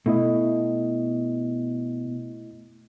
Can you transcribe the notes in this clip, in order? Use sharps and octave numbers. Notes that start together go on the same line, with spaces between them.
B2 A3 E4 D#5